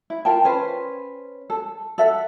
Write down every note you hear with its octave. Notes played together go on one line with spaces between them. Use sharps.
E4
F4 A#4 G5 A5
C#4 B4 C5
A4
A4 E5 F#5